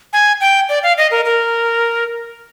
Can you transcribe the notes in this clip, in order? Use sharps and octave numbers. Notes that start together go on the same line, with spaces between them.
G#5
G5
D5
F5
D#5
A#4
A#4